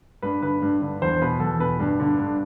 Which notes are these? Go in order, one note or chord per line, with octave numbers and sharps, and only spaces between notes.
G2 B4
D3 B4
G2
D3
E2 C5
B2 B4
E2 A4
B2 B4
G2
D3
G2